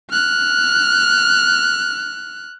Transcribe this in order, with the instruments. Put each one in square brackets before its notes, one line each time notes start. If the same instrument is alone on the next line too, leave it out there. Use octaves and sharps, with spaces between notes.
[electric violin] F6 F#6